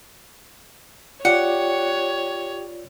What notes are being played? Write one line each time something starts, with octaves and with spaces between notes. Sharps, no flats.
F4 G4 C#5 D5 F#5